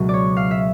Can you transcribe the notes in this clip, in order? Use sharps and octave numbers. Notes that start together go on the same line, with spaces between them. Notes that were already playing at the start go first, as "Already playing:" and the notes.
Already playing: C#2 B2 F#3 A3
C#5 D5
F5
E5